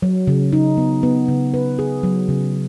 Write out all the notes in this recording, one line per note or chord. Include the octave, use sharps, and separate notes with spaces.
F#3
C#3
D#4
B3
B3
C#3
B4
G#4
F#3
C#3